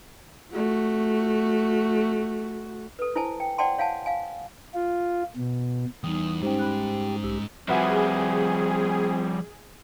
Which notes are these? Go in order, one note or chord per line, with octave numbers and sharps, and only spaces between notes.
A3 F#4
A4 B4
E4 C5 G#5 A5
G5
C5 D5 F#5 G5 A5 C6
C#5 F5 F#5 G#5 A5
F5 G#5
F4
B2
E2 G3 D#4 D#6
G#2 C#4 D#4 G4 C5 G5
B5 F#6
B1 G4 E6
F3 G3 C4 F#4 G#4 B4 E5